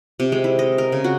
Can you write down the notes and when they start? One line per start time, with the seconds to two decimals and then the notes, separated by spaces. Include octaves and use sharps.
0.20 C3
0.32 G#3
0.44 E4
0.59 D#5
0.78 A#4
0.92 C#3
1.04 F#4